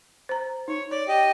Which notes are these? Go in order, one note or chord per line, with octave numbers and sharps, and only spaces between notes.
C5 A#5
D#4 C#5
C#5 D5
G4 D#5